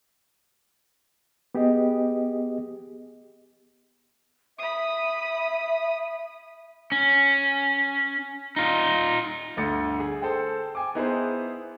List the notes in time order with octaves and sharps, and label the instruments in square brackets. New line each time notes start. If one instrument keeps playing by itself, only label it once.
[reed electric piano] B3 G4 G#4 D#5
[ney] E5 [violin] B5 D#6
[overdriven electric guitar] C#4
D#4 F4
[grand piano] G1 D2 A3 A6 C#7
G#4
A4 C5 G5
G5 G#5 D6
B3 D#4 E4 G#4 B4 C5